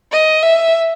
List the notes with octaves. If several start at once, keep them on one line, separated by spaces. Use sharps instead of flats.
D#5
E5